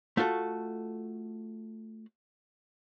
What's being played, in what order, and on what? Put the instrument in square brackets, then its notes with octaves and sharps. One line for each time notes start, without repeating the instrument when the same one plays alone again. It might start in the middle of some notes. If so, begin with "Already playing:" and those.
[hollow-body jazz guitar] A3 F4 F#4 A4